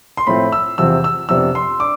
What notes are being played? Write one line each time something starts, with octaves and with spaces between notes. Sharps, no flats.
C6
A2 F3 A3 C4 B5
E6
E2 C3 F3 C4 E6
E6
F2 C3 F3 B3 D4 E6
C6
D4 D6